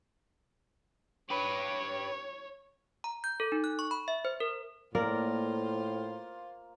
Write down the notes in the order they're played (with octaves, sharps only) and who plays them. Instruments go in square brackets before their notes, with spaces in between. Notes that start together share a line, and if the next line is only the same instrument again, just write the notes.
[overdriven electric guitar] G4 B4 [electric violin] C#5
[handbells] A#5
G6
A4
D#4
F#6
C#6
B5
E5
C5
A#4
[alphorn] A2 [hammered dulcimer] A#3 [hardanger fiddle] F4 C5 [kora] A#4 D5